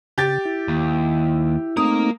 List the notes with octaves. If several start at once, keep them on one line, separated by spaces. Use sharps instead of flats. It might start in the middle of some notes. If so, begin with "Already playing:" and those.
C#3 G4 A6
E4
D#2
A3 A#3 C4 D#4 A#4 D#6